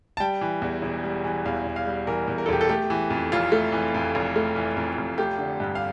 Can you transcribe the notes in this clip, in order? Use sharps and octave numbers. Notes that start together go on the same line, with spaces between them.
A5
G3 G5
E3
E2
E1
G3
E3
E2 F5
E1
F5
G3
E3 A#4
E2
A#4
A4
E1 G4
A4
A3 G4
E3
F2
F1 F4
A3
E3
F2
F1
A3
E3
F2
F1
A3 G4
D3
G2
F5